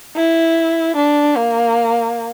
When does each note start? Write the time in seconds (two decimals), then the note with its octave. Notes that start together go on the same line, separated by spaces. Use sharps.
0.16 E4
0.96 D4
1.37 A#3